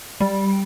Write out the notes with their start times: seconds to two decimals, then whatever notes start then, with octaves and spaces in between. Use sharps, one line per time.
0.20 G3